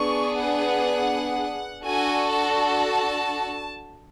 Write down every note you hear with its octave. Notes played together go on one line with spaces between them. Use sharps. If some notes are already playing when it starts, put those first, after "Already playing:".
Already playing: B3 D4 G#4 C#6
F#5
D4 F#4 A4 G#5
A5